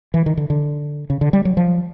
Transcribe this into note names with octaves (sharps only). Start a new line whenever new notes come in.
E3
D#3
D3
D3
C#3
D3
G3
F#3
F3